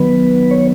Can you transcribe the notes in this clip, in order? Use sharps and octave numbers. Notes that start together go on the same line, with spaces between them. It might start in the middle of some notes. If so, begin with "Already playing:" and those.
Already playing: D#3 F#3 B3 B4
C#5